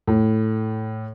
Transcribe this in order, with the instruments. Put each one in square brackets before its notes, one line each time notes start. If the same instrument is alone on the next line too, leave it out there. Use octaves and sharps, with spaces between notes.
[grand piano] A2